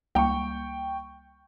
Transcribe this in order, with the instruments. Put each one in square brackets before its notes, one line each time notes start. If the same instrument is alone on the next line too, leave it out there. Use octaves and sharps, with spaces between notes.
[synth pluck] C#2 G3 A#3 [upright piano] G5 C#6